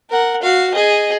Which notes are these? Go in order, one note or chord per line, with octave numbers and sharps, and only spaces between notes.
A#4 F#5
F#4 F5
G#4 D#5